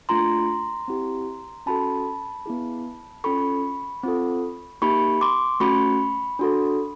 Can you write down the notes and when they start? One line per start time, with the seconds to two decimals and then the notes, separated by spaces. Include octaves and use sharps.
0.09 A3 D4 F4 A#5 C6
0.88 C4 E4 G4
1.66 C#4 F#4 A4 A5 B5
2.46 B3 E4 G#4
3.24 C#4 F4 A4 B5 C#6
4.03 C4 F4 A4
4.82 A#3 D#4 G4 B5 C#6
5.21 C6 D6
5.60 A3 C#4 F#4 B5 C#6
6.39 D4 F#4 A4